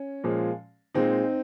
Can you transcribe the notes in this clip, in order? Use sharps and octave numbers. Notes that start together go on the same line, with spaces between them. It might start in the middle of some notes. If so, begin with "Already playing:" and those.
Already playing: C#4
A#2 F3 G#3
A#2 G#3 C4 D#4